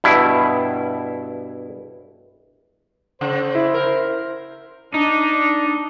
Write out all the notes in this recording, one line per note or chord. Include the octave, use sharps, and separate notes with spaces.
G2 B2 E4
C#3 C5
E4
A#4
D4 D#4